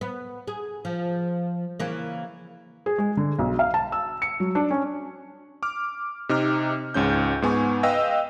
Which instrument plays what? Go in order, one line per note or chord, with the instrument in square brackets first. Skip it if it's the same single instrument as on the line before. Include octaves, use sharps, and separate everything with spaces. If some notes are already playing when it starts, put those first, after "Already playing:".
[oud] B3
G#4
F3
C#3 E3 A#3
[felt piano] G#4
G#3
D3
B1
F5
A5
E6
C#7
F#3
D4
C#4
[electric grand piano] D6 F6
C3 D#4 D6 F6
C#2 G#2 C#4 G6
G#2 B3 G#5 C#6
B4 D#5 F5 G5 E6 A#6